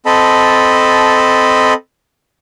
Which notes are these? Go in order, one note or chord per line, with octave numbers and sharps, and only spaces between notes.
C4 A4 D#5 A5 B5